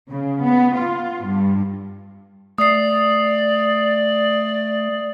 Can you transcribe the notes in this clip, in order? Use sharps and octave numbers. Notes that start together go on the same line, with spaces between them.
C#3
B3
F4
G2
A3 D5 D#6 C7